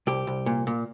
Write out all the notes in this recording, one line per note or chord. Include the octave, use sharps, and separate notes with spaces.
C2 G4
C2
A#2
A#2